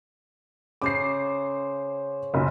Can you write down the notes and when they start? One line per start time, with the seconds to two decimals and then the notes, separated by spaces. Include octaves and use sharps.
0.82 C#3 C5 D6 C7
2.34 F#1 B1